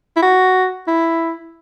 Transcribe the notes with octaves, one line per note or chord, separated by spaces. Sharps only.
E4
F#4
E4